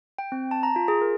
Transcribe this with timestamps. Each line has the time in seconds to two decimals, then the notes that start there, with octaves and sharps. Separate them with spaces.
0.18 G5
0.32 C4
0.51 A5
0.63 A#5
0.76 F4
0.88 G#4
1.01 A#4